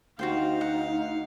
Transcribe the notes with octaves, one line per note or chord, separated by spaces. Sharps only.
D2 D#4 F#4 C5 F5 G5
F#5